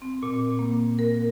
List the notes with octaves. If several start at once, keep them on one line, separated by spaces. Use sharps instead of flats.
C4
A#2
A#3
A#4